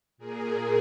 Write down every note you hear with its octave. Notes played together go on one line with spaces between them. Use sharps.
A#2 A#3 G#4